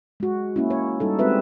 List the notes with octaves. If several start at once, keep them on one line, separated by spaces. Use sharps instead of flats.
G#3 F#4
A#3 C#4 E4
C#5
G3 D#4 A4
G#3 C4 F#4 B4 E5